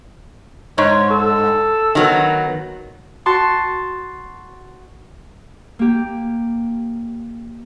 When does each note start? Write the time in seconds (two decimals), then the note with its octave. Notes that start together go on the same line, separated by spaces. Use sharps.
0.78 G#2 C#5
1.10 A4
1.95 D#3 F#3 B3
3.26 F#4 A5 C6 C#6
5.79 A#3 G4